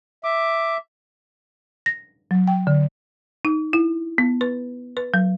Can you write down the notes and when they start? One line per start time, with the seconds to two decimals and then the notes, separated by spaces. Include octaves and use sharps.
0.24 E5 D6
1.86 A#6
2.31 F#3
2.48 G5
2.67 D3
3.45 D#4
3.73 E4
4.18 B3
4.41 B4
4.97 B4
5.14 F#3